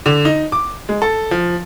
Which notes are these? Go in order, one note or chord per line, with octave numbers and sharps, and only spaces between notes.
D3
D#4
D6
G#3
A4
F3